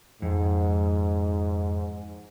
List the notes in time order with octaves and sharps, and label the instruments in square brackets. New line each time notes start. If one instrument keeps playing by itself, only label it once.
[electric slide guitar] F2 [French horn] G#2